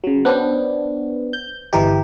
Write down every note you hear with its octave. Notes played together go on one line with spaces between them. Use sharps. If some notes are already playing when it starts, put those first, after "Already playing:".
C#3 F#3
B3 D4 C5 C#5 G5
G6
G1 E3 G4 D#5 A#5